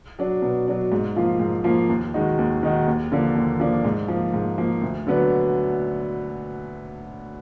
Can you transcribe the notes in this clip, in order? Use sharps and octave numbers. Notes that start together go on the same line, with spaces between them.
F#3 D4
B2
F#3 D4
G#2
F3 A#3 F4
G#2
F3 A#3 F4
D#2
D#3 G#3 D#4 F#4
D#2
D#3 G#3 D#4 F#4
D#2
D3 F3 A#3 D4
D#2
D3 F3 A#3 D4
G#2
F3 A#3
G#2
F3 A#3
D2
D3 F#3 B3 D4